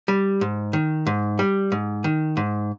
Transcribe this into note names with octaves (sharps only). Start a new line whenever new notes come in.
G3
G#2
D#3
G#2
G3
G#2
D#3
G#2